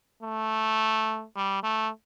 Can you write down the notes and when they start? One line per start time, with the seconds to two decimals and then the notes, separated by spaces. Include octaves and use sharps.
0.23 A3
1.36 G3
1.63 A3